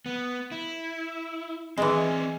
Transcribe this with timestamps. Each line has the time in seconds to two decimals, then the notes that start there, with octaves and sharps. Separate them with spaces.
0.06 B3
0.52 E4
1.78 E3 G#3 C4 D5 G#5